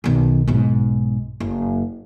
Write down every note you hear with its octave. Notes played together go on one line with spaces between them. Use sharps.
B1 D#3
B1 G#2
F#1